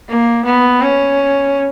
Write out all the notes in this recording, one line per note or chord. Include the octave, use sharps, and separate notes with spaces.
A#3
B3
C#4